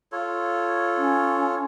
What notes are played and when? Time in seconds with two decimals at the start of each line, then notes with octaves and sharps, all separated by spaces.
0.12 F4 A4 C#5
0.97 C#4